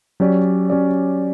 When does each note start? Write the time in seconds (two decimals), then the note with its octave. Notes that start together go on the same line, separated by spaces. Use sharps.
0.20 F#3 C#4 G4 D5
0.70 F#3 C#4 G4 D5